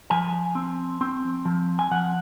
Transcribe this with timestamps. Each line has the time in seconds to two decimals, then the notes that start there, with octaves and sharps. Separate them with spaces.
0.10 F3 G#5
0.55 C4
1.01 C4
1.45 F3
1.79 G#5
1.91 F3 F#5